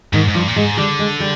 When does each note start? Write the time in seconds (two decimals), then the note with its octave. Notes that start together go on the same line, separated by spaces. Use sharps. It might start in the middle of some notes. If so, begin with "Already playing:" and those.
0.13 G#2 D#3
0.28 G#2
0.35 G2 F3
0.48 A#2
0.56 G#2 G#3
0.77 D3 G3
0.99 G#3
1.20 G3